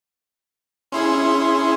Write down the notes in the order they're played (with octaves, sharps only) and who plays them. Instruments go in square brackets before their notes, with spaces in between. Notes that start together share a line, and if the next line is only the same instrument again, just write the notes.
[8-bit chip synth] C#4 E4 G#4 [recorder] C6